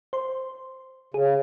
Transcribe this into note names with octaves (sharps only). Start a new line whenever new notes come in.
C5 C6
C#3 G#4